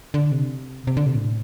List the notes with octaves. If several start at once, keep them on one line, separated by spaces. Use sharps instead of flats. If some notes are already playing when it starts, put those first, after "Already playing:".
D3
C3
C3
D3
C3
A2